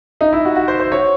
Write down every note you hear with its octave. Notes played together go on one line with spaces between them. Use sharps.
D#4
E4
F#4
F#4
C5
C5
C#5